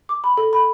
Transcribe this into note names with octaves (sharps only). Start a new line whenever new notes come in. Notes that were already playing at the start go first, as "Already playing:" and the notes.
D6
B5
A4
B5